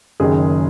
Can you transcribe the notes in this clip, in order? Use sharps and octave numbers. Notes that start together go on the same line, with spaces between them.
F#1 F#2 D#3 G#4